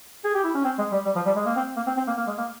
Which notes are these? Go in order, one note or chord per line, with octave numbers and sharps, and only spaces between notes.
G#4
G4
E4
C#4
C4
G#3
G3
G3
F3
G3
G#3
A#3
C4
A#3
C4
C4
A#3
A#3
G#3
A#3